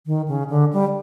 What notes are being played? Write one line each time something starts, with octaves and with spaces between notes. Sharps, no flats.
D#3
C#3
D3
G3